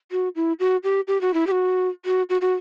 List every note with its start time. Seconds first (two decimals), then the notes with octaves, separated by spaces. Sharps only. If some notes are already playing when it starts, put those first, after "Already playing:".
0.12 F#4
0.36 E4
0.60 F#4
0.84 G4
1.08 G4
1.21 F#4
1.34 E4
1.47 G4
1.52 F#4
2.05 F#4
2.29 F#4
2.41 F#4